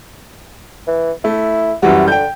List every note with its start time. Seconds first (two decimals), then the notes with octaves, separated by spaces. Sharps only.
0.88 E3
1.25 A3 E4
1.83 F#2 E3 G3 F#4
2.08 D3 G5 G6